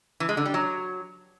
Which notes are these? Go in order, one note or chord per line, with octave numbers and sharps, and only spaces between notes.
E3
G#3
D3
G3
F#3